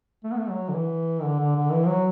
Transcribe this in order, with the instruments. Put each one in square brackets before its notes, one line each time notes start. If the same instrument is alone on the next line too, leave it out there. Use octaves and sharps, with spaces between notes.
[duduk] A3
B3
A3
F#3
D3
E3
D3
D3
D3
E3
F#3